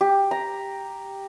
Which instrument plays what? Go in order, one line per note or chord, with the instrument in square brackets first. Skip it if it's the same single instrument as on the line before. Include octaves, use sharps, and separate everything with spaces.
[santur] G4
A#5